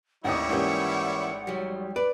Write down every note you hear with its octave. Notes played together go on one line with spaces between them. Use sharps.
A1 D#2 G3 E4 C#5 F#5 D#6
G#1 E3 A#3 C#4 G4
F#3 G3
B4 D5